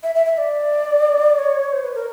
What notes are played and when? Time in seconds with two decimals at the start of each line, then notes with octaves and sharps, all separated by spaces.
0.03 E5
0.15 E5
0.26 E5
0.38 D5
1.39 C#5
1.72 C5
1.84 B4
1.95 A#4